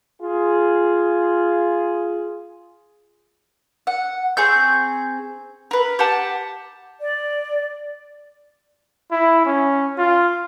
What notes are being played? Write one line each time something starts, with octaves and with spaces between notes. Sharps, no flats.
F4 G#4
F#5
C4 G#4 C#6 G6
A#4 B4
G4 F#5 A5
D5
E4
C#4
F4